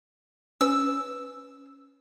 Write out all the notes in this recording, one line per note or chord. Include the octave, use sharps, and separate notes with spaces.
C#4 B4 E6